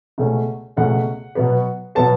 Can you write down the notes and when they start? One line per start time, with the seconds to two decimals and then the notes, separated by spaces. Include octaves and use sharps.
0.18 C#2 B2 A3 C#4
0.77 C#2 B2 A3 C#4 F#5
1.35 B2 F#3 B3
1.95 B2 F#3 B3 A5